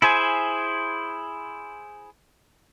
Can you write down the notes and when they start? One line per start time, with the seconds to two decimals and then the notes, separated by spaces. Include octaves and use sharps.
0.02 E4 G#4 C5 G#5